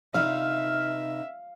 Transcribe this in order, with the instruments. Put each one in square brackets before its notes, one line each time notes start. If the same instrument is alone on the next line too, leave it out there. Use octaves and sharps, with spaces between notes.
[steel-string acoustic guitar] C3 D#4 B4 [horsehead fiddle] E5 [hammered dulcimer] F5